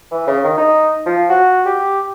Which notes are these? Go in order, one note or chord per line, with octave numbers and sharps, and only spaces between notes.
E3
C#3
D#3
D#4
F3
F#4
G4